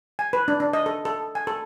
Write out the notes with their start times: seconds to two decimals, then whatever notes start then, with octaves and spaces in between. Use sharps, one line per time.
0.19 G#5
0.33 B4
0.48 D4
0.60 D4
0.73 D#5
0.86 A4
1.05 A4
1.35 G#5
1.47 A4